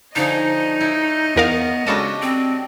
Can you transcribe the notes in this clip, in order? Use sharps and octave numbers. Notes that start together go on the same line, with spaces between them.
D3 F3 D#4 G#4 C#5 D#5
E4
E2 B3 A#4 F5
C#3 G#3 D4 F#4 G4 A4 D#7
C4